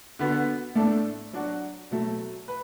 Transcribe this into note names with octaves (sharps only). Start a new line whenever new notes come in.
D3 B3 F#4
A2 A3 D4 A4
F#3 D4 F#4
B2 F#3 A3
B4